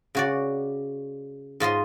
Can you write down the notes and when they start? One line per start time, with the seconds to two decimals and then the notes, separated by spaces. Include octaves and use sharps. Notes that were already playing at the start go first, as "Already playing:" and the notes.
0.15 C#3 F#4 D5
1.60 G#2 F4 D#5 C6